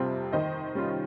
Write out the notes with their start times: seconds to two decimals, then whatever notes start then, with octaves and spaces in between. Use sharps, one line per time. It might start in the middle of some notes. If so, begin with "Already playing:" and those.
Already playing: F2 C3 G3 C4 F4
0.32 D#3 C5 D#5
0.75 G3 C#4 F4